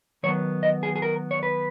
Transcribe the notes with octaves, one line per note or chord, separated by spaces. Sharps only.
D#3 F#3 B3 C#5
D#5
G#4
G#4
A#4
C#5
B4